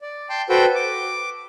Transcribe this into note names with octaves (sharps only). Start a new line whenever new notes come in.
D5
G5 A5 C6
F#4 A4 B4 C5 G5
D6